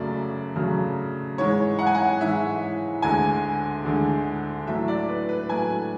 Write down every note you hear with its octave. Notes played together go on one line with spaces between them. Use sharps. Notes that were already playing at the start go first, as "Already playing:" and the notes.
Already playing: F#2 C#3 F#3 A3 D5
F#2 C#3 F#3 A3
G#2 E3 G#3 C#5
F#5
G#5
F#5
G#2 E3 G#3 E5
D2 D3 G#3 G#5
D2 D3 G#3
A2 F#3 A3 E5
D5
B4
B4
A2 F#3 A3 G#5